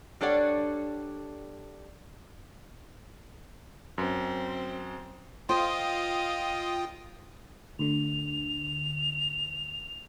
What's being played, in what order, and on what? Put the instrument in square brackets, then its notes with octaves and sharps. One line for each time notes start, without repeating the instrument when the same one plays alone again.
[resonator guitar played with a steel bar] G3 D4 A4 C#5 D5 F#5
[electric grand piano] F#2 [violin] C4
[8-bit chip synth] F4 G5 D#6 [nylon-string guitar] C5 [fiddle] D#5 F5
[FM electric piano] D2 D3 [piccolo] F7